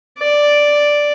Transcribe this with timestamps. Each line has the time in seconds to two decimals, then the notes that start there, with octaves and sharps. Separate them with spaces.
0.19 D5